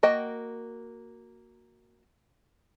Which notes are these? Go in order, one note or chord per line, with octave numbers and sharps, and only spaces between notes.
A#3 F#4 D#5 G5